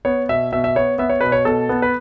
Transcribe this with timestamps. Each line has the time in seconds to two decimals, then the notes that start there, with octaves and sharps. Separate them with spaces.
0.05 B3 C#5
0.29 B2 E5
0.52 B2 E5
0.64 E5
0.75 B3 C#5
0.98 B3 E5
1.10 C#5
1.21 B2 B4
1.32 C#5
1.45 B2 A4
1.69 B3
1.82 B4